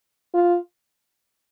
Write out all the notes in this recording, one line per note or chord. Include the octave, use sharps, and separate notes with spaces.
F4